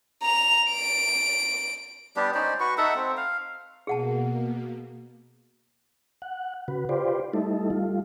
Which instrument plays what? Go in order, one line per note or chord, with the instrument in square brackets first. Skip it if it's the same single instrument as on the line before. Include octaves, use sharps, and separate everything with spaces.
[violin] A#5 F7
D7
[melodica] G3 B3 D4 G4
C#4 D#4 C5 D5
F#4 B4 C#6
D#4 A4 E5 F#5
C4
F5
[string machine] B2 A#3 [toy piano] G#4 F#5 A5
[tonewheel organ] F#5
C#3 F#4 B4
F4 G4 B4 C5 D5
G3 A3 D#4 E4 A4
G3 F4